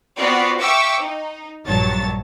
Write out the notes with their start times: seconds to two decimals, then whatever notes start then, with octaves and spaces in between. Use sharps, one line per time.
0.16 B3 C4 F4 F#4 D5
0.60 E5 F5 G5 C#6 D6 E6
1.00 D#4
1.65 A#1 G2 F#3 C#5 A5 A6